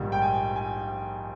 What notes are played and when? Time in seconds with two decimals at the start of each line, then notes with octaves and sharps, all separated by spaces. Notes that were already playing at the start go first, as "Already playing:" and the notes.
Already playing: A#1 G#2 D#3 G3
0.12 G5
0.22 G#5
0.56 G#5